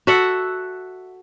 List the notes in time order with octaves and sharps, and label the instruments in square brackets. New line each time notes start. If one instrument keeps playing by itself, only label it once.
[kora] F#4 A4 E5 F#5